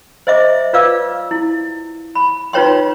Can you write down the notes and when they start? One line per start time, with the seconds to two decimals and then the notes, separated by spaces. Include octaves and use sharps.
0.27 C5 D#5 E5 D6
0.73 F4 B4 D5 F5 D6 E6
1.31 E4
2.15 B5
2.53 D#4 F4 B4 C#5 G5 C6